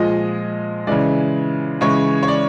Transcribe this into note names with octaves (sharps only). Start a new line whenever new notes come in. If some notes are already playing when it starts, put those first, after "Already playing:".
Already playing: A#2 F3 G#3 D#5
C#3 E3 G#3 D5
C#3 E3 G#3 C#5
C#5
D5